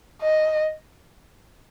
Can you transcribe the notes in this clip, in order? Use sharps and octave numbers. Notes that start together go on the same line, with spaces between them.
D#5